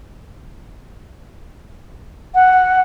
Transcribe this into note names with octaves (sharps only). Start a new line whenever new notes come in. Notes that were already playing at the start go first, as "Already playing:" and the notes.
F#5